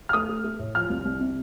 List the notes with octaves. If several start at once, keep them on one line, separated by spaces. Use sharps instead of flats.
F6
A3 D#6
A3
A3
A2
F3 F6
C2
C2
C3